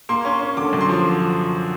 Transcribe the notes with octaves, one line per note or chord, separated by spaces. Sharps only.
A#3 C6
C#4
C#4
D3 D6
F#2
C6
F3